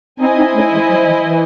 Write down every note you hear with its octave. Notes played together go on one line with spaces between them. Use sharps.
C4 D#4 E4 C5 D#5 G#5
C4 D#4
A3 C#4
E3 G#3
F#3
E3
E3